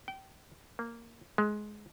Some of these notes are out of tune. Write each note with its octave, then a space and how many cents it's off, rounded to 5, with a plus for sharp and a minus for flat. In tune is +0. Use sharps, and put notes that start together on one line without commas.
G5 -25
A#3 -5
G#3 +15